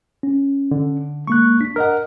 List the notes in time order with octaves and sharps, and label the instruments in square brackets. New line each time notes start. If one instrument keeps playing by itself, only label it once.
[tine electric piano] C#4
[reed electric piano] D3
[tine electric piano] G#3 A#3 F#6 [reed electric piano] C#6
[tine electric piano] D4 B6
[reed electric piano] A#4 D#5 F#5 [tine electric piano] F6